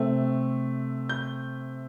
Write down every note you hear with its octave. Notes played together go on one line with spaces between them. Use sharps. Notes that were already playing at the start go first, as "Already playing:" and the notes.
Already playing: C3 A3 C4
G6